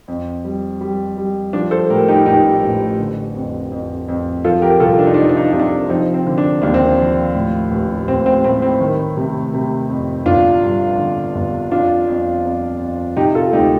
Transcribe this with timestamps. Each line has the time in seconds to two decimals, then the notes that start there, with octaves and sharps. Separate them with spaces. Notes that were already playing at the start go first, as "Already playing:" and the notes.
0.08 F2
0.45 G3
0.81 G3
1.17 G3
1.53 F3 D4
1.71 A4 C5
1.90 A2 G4 A#4
2.08 D#4 G4
2.26 A1 D#4 G4
2.63 A1
2.99 D3
3.35 F2
3.72 F2
4.08 F2
4.44 F3 F4 A4
4.62 G4 A#4
4.80 C2 F4 A4
4.99 D4
5.06 D#4
5.14 D4
5.17 F3 D#4
5.29 D4
5.37 D#4
5.45 D4
5.52 C3 D#4
5.60 D4
5.89 F3 C4 D#4
6.14 C4
6.27 D3
6.38 D4
6.62 D#2 D4
6.74 C4
6.85 D4
6.99 F3
7.35 A2
7.71 A1
8.08 A1 C4
8.26 C4
8.44 A2 C4
8.62 C4
8.81 D#3
9.17 C3
9.54 C3
9.90 F2
10.26 G1 D4 F4
10.62 G2
10.98 D3
11.35 G1
11.71 F2 D4 F4
12.08 F2
12.45 F2
12.80 F2
13.17 C3 D#4 G4
13.35 F4 A4
13.53 D2 D#4 G4